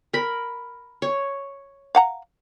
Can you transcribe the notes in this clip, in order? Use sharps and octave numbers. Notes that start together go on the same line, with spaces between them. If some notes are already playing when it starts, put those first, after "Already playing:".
A#4 B5
C#5
F5 F#5 A#5